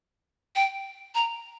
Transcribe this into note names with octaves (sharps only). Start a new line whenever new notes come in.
G5
A#5